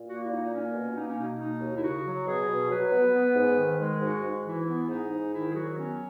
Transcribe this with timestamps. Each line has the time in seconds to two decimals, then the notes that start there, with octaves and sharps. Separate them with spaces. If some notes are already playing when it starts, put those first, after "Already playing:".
Already playing: A#2
0.08 A#3 F#4
0.24 E4
0.30 A#2 D#4
0.41 D#4
0.52 A#3 C#4
0.74 B2
0.96 A#3 D#4
1.07 C#4
1.17 B2 D#4
1.39 A#3 D#4
1.61 D#2
1.74 E4
1.83 C#3 F#4
2.05 F#3
2.27 B2 G#4
2.49 B2
2.70 F#3 B4
2.92 B3
3.14 B3
3.36 G#2
3.58 D#3
3.79 G#3
4.01 G#2 F#4
4.23 G#2
4.45 E3 E4
4.67 B3
4.89 G#2 D#4
5.11 G#2
5.32 D#3 E4
5.50 G#4
5.54 F#3 F#4
5.76 B3 C#4